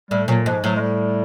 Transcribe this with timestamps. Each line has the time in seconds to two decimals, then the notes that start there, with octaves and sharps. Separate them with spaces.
0.11 A2 G3
0.28 A#2 F#3
0.46 G#2 F3
0.63 A2 F#3
0.76 G#3
0.80 G3